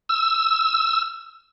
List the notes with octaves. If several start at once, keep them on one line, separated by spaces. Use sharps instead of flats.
E6